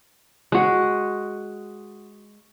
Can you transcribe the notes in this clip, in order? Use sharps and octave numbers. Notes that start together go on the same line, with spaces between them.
G#3 F#4